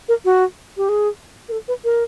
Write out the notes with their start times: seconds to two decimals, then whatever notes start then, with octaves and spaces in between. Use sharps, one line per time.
0.09 A#4
0.25 F#4
0.77 G4
0.89 G#4
1.49 A#4
1.52 A4
1.68 B4
1.84 A#4